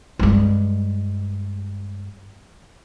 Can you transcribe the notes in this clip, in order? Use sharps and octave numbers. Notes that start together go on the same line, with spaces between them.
G2 G#3